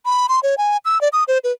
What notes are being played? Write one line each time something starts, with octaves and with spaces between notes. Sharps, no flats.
B5
C6
C#5
G#5
E6
D5
D#6
C5
B4